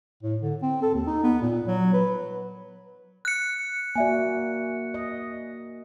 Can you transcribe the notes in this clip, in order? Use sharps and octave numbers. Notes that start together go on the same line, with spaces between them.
A2
D3
C4
A4
D#2
D#4
B3
A#2
F#3
B4
F#6 C#7
A#3 F#4 D5 E5 G#5
D#5